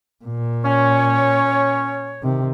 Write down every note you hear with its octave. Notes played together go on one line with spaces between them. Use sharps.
A#2
C#4 C#5
C3 D#3